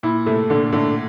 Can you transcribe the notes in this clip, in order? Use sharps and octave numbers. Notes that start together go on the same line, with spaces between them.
A#2 E4
A2 C3 A3
A#2 D3
A2 D3